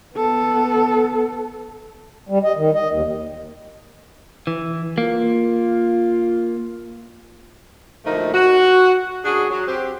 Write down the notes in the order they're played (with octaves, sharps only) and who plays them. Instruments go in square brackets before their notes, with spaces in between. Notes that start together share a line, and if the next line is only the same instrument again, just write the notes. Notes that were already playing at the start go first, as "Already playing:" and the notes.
[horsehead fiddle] B3 A4
[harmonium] G3
D#5
D#3
D#5
D#2
[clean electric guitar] E3
[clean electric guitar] A#3 [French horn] F4
[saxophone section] D2 A#2 F3 A3 D#4 A#4
F#4
F#2 D4 F#4 G#4
F#3
C4 G4